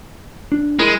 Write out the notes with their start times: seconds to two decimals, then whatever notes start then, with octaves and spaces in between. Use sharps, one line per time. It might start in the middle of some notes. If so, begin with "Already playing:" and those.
0.52 D4
0.79 G#3 E4 A#4 B5